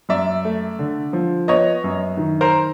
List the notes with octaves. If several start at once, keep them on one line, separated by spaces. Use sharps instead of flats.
F#2 D5 E5
A3
D3
F3
B3 C#5 D#5
F#2
D#3
A#4 C5